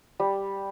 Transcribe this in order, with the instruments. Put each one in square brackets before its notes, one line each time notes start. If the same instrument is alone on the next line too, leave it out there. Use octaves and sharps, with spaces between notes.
[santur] G3